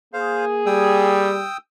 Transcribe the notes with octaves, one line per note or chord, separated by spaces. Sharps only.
A#3 G#4 C5 F5
G3 G5 D#6 E6